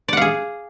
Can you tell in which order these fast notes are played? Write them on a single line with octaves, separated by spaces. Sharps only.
D5 F#5 F5 G#4